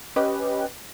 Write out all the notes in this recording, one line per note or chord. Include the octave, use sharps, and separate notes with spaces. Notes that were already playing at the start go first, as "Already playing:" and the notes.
C#4 G4 B4 D#5